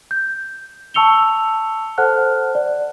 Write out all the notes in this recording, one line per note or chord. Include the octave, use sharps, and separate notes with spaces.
G6
A5 C#6 E6 C#7 F7 G7
A4 C5 F#5 A5 F6 F#6
D5